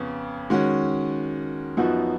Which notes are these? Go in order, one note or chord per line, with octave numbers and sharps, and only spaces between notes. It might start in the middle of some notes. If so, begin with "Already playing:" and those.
Already playing: F2 C#3 B3
D#3 G#3 C#4 F#4
F#2 F3 B3 D#4 F#4